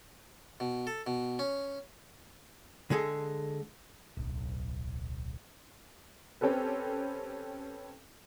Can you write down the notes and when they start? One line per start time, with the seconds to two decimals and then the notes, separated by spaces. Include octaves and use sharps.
0.60 B2
0.87 A4
1.07 B2
1.39 C#4
2.90 D3 G#3 G#4 A4
4.17 D1 B1
6.41 C4 C#4 G4 A4 B4